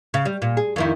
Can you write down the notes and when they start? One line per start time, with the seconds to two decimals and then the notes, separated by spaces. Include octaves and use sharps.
0.14 C#3
0.25 G3
0.42 A#2
0.57 G#4
0.76 F2 D#3 E4